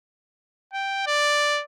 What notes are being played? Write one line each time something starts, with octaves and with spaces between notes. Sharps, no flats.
G5
D5